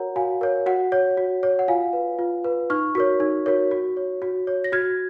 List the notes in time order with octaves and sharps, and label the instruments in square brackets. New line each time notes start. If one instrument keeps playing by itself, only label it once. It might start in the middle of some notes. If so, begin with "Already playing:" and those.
Already playing: [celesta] F#4 A#4 C#5 F#5 A#5
F#4 F5 G#5
A#4 C#5
F#4 F#5
C#5
F#4
C#5
F#5
F4 F5 G#5
B4
F4
B4
D#4 C#6 F6
F#4 A#4 C#5
D#4
F#4 A#4 C#5
F#4
C#5
F#4
C#5
A#6
F#4 F6 G#6